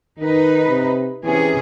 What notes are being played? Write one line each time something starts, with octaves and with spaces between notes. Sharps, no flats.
D#3 D#4 B4
C3
C3 E3 C#4 G#4